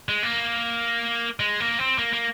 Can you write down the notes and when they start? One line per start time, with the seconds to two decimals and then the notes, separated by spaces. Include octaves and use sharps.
0.09 G#3
0.23 A#3
1.40 G#3
1.60 A#3
1.79 C4
1.98 A#3
2.13 A#3